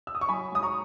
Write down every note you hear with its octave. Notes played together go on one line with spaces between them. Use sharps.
E6
D#6
C#6
F#3 G#5 B5
G#2 D#6
A#5 C#6